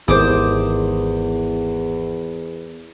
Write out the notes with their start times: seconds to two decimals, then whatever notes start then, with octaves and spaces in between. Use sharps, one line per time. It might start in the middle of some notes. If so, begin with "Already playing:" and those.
0.08 G#1 E2 G4 G#4 A#4 C5 D6 D#6